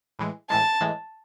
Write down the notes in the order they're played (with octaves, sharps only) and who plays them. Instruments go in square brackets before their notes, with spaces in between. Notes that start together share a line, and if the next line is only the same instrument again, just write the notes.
[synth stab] A2 E3 G#3
[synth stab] A2 E3 G#3 [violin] A5
[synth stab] A2 E3 G#3